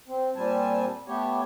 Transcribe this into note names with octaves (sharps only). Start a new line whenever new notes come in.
C4
A#2 G3 C4 G#5 A5
A3 B3 G4 C#5